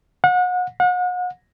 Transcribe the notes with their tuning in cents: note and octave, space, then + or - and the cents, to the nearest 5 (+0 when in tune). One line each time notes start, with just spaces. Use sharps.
F#5 -35
F#5 -40